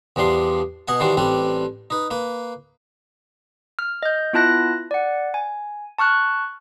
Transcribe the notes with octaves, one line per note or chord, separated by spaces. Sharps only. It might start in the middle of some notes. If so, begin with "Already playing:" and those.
E2 F3 G3 D4 C6
B2 D#5 F#5 G#5
D#3 E3 G3 D4 F#4 C5
A1 G3 C4 D4 B4
D#4 B4
A#3 B4
F6
D#5 G6
B3 E4 F4 A5 F#6 A#6
D5 F#5
G#5
A5 C#6 F6 F#6